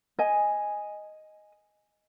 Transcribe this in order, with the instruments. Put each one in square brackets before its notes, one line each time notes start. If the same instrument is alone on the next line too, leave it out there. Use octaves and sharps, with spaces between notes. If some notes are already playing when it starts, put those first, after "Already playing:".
[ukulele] D#5 G#5